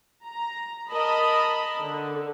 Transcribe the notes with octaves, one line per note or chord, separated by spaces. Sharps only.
A#5
A#4 D#5 A5 B5
D3